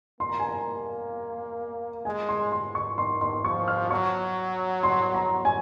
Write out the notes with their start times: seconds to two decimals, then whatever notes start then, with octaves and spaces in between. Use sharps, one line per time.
0.20 A#3 C6
0.29 A#5
0.39 G#5
0.49 A#5
2.05 G#3 G#5
2.29 C6
2.52 C6
2.75 C#6
2.97 D#3 C6
3.21 C6
3.44 F3 C#6
3.68 F6
3.91 F#3 C#6
4.83 C6
5.15 A#5
5.45 G#5